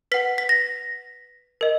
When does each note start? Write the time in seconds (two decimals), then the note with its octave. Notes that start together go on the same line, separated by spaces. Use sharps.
0.12 B4 F#5 B6
0.38 B6
0.49 A#6
1.61 A#4 D#5